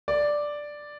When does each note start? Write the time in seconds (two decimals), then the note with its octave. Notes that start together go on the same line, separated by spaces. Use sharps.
0.08 D5